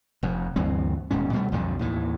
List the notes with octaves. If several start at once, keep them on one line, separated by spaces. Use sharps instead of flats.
F1 F2
D2 G2 E3 C4
D#1 G#2 B2 C#4
B2 G3 A3
B1 F2 G#2 D3
D#2 A2 E3